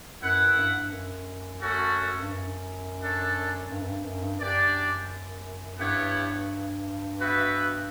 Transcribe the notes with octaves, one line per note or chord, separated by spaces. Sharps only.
F#2 E4 B4 F#5
G2
F#2
A3 C#4 F#4 A4
G2
F#2
D4 A4 C#5
G2
F#2
G2
F#2
G2
F#2 D4 G4 D5
G2 B3 E4 G4 C#5 F#5
B3 F#4 B4 E5 G5